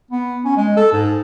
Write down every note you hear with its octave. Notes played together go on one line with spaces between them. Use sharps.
B3
C#4
G#3
A4
G#2